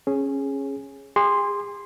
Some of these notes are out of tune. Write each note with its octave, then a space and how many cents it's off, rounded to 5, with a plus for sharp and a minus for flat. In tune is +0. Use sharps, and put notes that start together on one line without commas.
C#4 -15 G#4 +0
G#4 -40 C6 +0